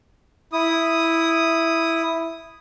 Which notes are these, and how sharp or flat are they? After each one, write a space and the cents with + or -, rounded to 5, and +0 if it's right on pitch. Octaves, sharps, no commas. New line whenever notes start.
E4 +0 D#6 +0